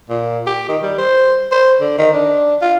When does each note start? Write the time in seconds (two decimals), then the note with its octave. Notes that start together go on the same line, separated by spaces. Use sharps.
0.10 A#2
0.47 G4
0.69 D#3
0.83 G3
0.98 C5
1.52 C5
1.80 D3
1.99 D#3
2.13 D4
2.62 F4